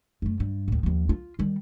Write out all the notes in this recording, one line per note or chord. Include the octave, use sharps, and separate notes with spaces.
F#2 A3
G2
D#2 A2
D#2 F3
F4
D#3 G3